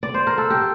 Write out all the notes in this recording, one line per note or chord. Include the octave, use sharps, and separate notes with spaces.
D5
C5
A#4
A4
G4